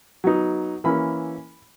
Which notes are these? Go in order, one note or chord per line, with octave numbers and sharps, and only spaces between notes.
F#3 B3 D#4
E3 A#3 C#4 E4 B5